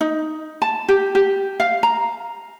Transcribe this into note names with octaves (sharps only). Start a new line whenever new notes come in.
D#4
A5
G4
G4
F5
A#5